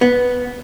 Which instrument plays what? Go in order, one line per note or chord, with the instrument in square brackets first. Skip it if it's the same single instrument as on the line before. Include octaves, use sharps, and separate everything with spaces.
[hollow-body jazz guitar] B3